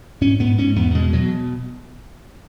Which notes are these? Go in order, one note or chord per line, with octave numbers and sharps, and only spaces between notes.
G#2 C#4
G#2 B3
G#2 C#4
E2 B3
B2 G#3
B2 F#3